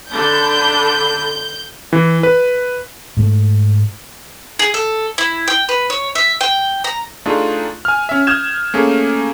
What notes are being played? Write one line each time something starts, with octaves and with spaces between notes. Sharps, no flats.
D3 D4 B5 G6
E3
B4
G#2 A3
G#4
A4
E4
G5
B4
C#5
E5
G5
A#5
A3 D4 D#4 F4 G#4
G#5 F6
C#4 E5
D#6 F6 G6 G#6 E7
A3 A#3 C#4 G#4